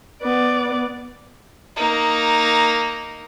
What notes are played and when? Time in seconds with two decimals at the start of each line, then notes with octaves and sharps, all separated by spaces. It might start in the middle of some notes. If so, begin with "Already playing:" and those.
0.22 B3 D5
1.76 A#3 D#4